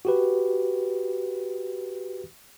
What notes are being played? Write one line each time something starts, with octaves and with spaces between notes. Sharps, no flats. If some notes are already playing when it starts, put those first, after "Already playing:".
F#4 G4 B4